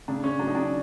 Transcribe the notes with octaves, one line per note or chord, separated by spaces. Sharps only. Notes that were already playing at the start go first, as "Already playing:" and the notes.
C#3 D4
C#4
F#3 D4
D#4
D4